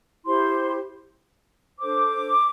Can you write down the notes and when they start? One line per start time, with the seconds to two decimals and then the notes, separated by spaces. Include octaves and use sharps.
0.25 E4 G4 C5 C6
1.78 D4 A4 C5 D6